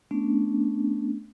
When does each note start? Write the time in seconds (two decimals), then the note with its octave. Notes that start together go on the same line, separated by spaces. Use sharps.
0.11 A3 B3 C#4 D4